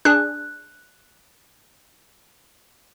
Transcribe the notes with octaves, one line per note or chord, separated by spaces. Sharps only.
D4 G#4 F#6